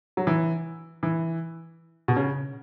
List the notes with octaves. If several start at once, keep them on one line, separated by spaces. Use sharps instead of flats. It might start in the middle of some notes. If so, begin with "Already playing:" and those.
F#3
E3
E3
B2
C#3